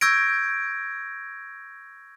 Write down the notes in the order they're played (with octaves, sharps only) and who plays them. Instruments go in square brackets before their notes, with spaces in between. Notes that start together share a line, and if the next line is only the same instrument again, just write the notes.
[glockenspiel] C#6 E6 G6 G#6 A#6 D7